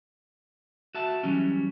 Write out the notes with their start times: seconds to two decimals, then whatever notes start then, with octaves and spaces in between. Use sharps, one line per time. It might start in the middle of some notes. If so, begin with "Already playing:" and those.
0.95 F#4 E5 A5
1.23 E3 F#3 G3 C#4